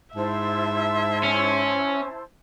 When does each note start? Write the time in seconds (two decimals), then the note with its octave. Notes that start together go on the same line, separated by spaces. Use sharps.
0.15 G#2 E4 C5 E5 A5
1.23 C#4